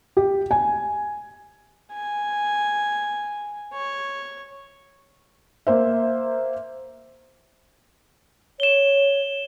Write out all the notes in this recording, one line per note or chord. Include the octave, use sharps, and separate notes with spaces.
G4
G#5
G#5
C#5
A#3 C5 E5
C#5 E7 G7